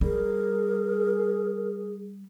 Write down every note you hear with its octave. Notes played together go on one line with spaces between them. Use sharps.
G3 G#4 A#4